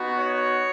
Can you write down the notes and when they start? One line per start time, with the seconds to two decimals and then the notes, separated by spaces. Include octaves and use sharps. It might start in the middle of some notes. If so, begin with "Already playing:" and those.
Already playing: B3 D#4 F#4
0.19 C#5